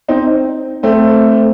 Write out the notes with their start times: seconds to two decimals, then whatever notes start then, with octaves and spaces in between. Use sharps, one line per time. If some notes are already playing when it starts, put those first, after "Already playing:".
0.08 C4 D#4
0.83 A3 C4